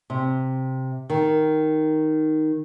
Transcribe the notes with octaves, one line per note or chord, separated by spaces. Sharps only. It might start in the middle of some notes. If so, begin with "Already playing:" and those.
C3
D#3